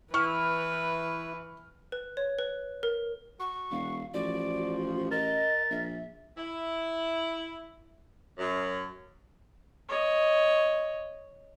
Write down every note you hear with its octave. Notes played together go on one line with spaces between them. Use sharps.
E3 E4 B4 C#6 F6
B4
C#5
B4
A#4
F#4 C#6
E1 F5
A1 F3 F#4 D5
A#4 D#5 A6
A#1 E5
E4
F#2
C#5 D#5